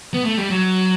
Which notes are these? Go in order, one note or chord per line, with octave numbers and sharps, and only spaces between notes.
B3
A3
G3
F#3